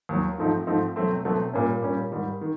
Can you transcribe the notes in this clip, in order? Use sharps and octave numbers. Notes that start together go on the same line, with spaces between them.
D#2 D#3 F#3
G#2 F3 A3 C4 D#4
G#2 F3 A3 C4 D#4
B2 F#3 A3 C4
B2 F#3 A3 C4
A#2 G3 A#3 C#4
A#2 G3 A#3 C#4
G#2 D#3 G3
D#3